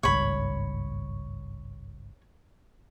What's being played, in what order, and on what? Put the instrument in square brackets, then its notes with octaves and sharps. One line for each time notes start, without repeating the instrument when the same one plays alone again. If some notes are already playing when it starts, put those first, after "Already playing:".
[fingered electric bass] G#1 C#2 G2 [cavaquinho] C#5 B5